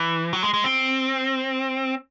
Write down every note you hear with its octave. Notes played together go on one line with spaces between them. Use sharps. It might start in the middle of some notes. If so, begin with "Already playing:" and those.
Already playing: E3
F#3
G#3
G#3
C4